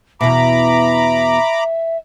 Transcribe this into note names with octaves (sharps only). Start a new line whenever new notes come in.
E2 B2 E5 A#5 B5 D6